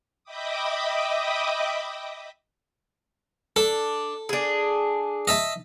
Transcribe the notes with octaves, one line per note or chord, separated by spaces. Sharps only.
D#5 E5 G5 B5 D6 D#6
D4 A4
D4 G#4
D#5 E5 A5